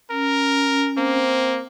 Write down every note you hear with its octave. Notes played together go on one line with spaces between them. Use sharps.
C#4 A#4
A#3 C4